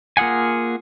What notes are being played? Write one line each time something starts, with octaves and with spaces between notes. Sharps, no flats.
A#3 F4 G#4 F#5 G#5